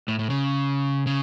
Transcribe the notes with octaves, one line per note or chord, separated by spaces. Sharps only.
A2
A2
C#3
C#3